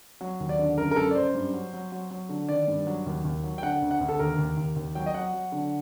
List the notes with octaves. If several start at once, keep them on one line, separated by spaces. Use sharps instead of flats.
F#3
D#2
D5
D3
F#2 A#4
A#4
F#2 A4
D5
F#2 C5
G2
F#3
F#3
F#3
F#3
D3
D#3 D5
G2
F#3
D#2
D#2
F#3
G5
D3 F#5
D2
F#5
D2
A4
D#2 A#4
D#2
D#2
D#2
F#3 G5
D#5
F#3 F#5
F#3
D3